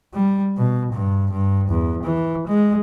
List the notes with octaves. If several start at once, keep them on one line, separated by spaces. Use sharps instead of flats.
G3
B2
G2
G2
E2
E3
G#3